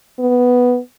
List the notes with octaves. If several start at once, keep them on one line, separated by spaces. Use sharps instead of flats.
B3